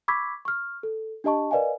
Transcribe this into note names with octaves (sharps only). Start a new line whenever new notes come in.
B5 C#6 D6 E6 G#6 B6
C#6 F6
A4
D4 G4 D#5 A5 C#6
A#4 B4 D5 D#5 F5 G#5